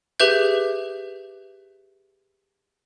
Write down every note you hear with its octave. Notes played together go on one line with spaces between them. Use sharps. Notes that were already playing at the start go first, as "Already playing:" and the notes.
G4 G#4 B4 E5 G6